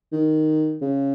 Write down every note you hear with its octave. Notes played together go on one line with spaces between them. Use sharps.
D#3
C#3